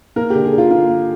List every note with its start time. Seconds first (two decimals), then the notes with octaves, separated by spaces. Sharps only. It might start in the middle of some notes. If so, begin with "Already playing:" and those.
0.16 A#3 A#4
0.30 D3 G4
0.45 G#4
0.53 D3
0.58 F4
0.71 A#3 F4
0.89 A#3